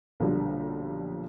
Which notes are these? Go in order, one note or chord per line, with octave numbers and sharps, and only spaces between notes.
B1 A#2 D3 F3 G3